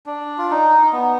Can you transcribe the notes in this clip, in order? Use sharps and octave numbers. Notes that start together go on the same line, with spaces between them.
D4
F4
D#4
B3